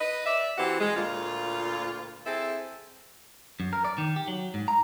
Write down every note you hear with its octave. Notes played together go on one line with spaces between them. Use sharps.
B4 D#5
D5 E5
E3 C4 F#4 G4 F#5
G#3
D2 A#2 F4
C4 E4 G#4 A4
F#2
A#4
D5
D#3
G4
F#3
G#2
A#5